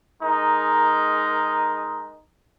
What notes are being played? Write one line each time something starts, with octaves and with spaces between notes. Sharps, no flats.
G#3 D#4 A#4